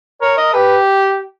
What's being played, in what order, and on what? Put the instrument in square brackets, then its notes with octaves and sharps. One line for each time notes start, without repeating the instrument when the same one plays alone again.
[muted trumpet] A#4 [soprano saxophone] C#5
[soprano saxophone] D#5
[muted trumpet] G4 [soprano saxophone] B4